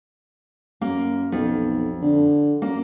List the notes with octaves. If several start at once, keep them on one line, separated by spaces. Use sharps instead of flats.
F#2 A#3
B1 F2
D3
F#2 A#3